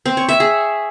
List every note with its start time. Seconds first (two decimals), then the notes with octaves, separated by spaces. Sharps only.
0.06 C4
0.17 C#5
0.29 E5
0.40 G#4